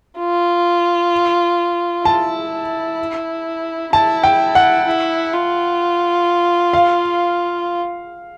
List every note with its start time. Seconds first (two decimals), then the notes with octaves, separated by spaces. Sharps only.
0.18 F4
2.05 E4 A5
3.92 E4 A5
4.24 G5
4.55 F#5
4.86 E4
5.33 F4
6.73 F5